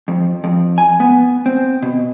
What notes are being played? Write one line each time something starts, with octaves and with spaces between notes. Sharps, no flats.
F2
F2
G#5
B3
C4
B2